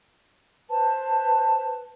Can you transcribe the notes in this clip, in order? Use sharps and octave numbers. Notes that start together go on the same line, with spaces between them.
B4 C5 A5